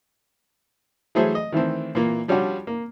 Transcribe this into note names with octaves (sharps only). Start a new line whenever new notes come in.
E3 F#3 A3 G#4 C5
D#5
D#3 E3 A3 C4
A#2 E3 A#3
F3 G3 C#4 D4 F4 F#4
A#3